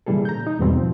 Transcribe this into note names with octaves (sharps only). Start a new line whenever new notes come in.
A#2 C#3 E3 G3 G#4 A4
A#5 G6
D#4
E2 G#2 B2 E3 G3 C4
F3